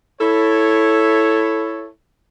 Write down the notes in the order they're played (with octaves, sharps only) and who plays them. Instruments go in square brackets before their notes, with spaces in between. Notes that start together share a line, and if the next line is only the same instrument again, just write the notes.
[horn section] E4 A4 C#5